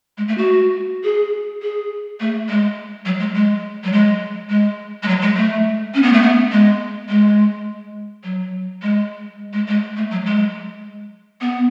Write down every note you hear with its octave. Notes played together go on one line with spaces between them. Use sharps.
G#3
A3
F#4
G#4
G#4
A3
G#3
F#3
G#3
G#3
F#3
G#3
G#3
G#3
F#3
G#3
A3
C#4
B3
A3
B3
G#3
G#3
F#3
G#3
G#3
G#3
A3
F#3
G#3
B3